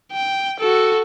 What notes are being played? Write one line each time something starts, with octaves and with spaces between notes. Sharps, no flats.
G5
F#4 A4